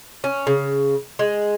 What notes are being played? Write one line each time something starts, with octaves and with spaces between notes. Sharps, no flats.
C#4
C#3
G#3